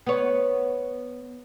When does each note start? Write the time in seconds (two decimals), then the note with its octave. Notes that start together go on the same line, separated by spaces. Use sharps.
0.07 B3 C#5